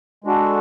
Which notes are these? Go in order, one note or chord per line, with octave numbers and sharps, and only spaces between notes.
G#3 D4 F#4 A4